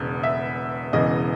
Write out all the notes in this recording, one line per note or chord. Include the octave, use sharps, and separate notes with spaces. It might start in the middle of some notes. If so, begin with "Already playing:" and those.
Already playing: E1 E2 C#3
E5
E1 E2 C#3 E3 D#5